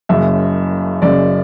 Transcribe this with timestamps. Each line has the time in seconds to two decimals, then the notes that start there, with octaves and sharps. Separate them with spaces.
0.09 F#1 F#2 C#3 E5
1.02 F#1 F#2 C#3 D5